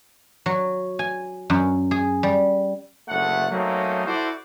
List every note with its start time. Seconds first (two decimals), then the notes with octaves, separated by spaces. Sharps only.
0.46 F#3
0.99 G#5
1.50 F#2
1.91 G#4
2.23 G3
3.09 F#1 D2 A3 F#5
3.51 F#3 A3 A#3 C4 C#4 D#4
4.06 E4 F#4 A4 C5 D5